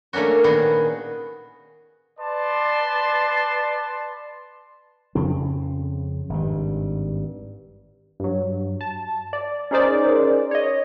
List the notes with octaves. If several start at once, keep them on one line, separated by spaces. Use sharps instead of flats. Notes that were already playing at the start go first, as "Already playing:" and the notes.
A3 A#3 C#4 D4 F#4
A#2 D#3 B3 F#4 G#4
B4 D5 A5 C6
F2 C#3 C4
G#1 G2
G2 F#3
A5
D5
C#4 D#4 G#4 A#4 C5 D5
C#5 D#5